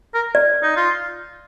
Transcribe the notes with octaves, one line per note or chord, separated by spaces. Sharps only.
A#4
D5
D#4
F4